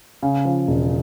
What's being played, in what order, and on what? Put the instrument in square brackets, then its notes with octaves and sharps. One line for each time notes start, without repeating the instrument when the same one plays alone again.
[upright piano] C#3
F3
E1